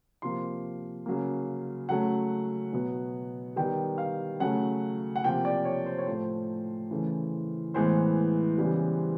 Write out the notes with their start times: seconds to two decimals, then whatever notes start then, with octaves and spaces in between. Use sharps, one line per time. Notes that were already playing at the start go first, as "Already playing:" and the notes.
0.22 C3 F3 A#3 C6
1.06 C#3 F#3 A#3
1.89 C#3 F#3 A3 F#5
2.73 B2 F#3 B3
3.56 D#3 G3 B3 G5
3.98 F5
4.40 C#3 F#3 A3 F#5
5.16 F#5
5.24 C3 F3 A#3 G5
5.45 D5
5.65 C#5
5.86 C5
5.98 C#5
6.07 A2 F3 A3 C5
6.91 C#3 E3 A3
7.74 A2 E3 G#3 B3 C5
8.58 C#3 E3 G3 B3